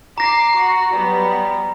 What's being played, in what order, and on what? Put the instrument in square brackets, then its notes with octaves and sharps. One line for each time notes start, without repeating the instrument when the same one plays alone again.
[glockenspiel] A#5 A#6 [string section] D6 C7
[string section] F#4
F#3 G3 B3